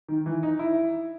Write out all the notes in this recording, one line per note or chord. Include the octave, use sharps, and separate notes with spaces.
D#3
E3
D#4
E4